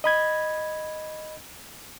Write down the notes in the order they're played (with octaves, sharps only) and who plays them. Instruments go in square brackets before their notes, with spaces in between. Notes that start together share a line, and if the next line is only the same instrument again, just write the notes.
[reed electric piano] D#5 B5 G#6